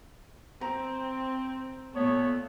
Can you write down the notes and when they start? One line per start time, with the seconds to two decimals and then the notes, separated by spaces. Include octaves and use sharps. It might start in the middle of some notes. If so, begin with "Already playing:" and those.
0.61 C4 A#5
1.96 A#2 A3 B3 C#5